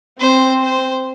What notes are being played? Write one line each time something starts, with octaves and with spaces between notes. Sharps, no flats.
C4 C5
C5